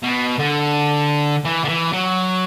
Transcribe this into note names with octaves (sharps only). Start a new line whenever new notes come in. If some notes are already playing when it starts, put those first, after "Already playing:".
B2
D3
E3
D3
E3
F#3